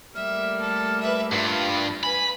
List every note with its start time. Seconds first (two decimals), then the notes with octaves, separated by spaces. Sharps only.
0.15 G3 A3 A#3 E5 F6
0.60 A4
1.00 B4 E5
1.32 G2 F4 F5
2.03 B4 G#5 B5